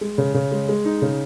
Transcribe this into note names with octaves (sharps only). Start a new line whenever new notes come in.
G#3
C#3
C#3
G#3
G#3
D#4
C#3